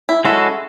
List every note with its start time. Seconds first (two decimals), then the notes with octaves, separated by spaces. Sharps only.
0.09 E4
0.25 G#3 C#4 E4 F#4 A4